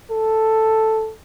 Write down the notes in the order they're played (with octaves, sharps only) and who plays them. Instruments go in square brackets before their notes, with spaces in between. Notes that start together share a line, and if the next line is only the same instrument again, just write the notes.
[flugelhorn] A4